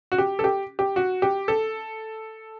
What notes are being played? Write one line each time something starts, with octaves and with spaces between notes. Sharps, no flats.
F#4
G4
A4
G4
G4
F#4
G4
A4